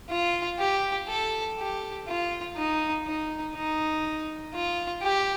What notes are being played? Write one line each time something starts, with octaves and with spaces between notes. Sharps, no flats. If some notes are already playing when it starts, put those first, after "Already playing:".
F4
G4
A4
G4
F4
D#4
D#4
D#4
F4
G4